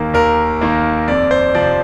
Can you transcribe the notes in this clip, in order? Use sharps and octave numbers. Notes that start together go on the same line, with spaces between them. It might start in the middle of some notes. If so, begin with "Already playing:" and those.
Already playing: D#2 D#3 A#3
D#2 A#4
D#3 A#3
F2 D5
C5
C3 F3 D5